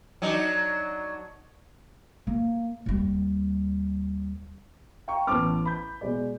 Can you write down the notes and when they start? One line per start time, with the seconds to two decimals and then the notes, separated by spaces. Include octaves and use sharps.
0.22 F#3 D4 D#4
2.27 A#3
2.86 D#2 G3
5.08 F5 G5 A#5 C#6
5.27 A1 B3 A5 C6 D6 F6
5.65 B5 G6
6.01 B2 G#3 D5